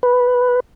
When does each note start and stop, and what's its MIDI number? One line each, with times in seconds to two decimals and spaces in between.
0.03 0.60 71